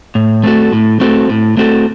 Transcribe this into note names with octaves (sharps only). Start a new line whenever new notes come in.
A2
A3 C4 F#4 A4
A2
A3 C4 F#4 A4
A2
A3 C4 F#4 A4